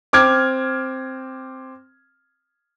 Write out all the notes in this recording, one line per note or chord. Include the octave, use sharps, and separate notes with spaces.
C4 D6 F6 G#6